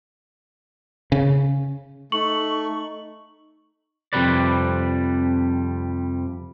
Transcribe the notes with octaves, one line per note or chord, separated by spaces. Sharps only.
C#3
A3 D#4 C#6 F#7
F2 C3 G3 B4 D5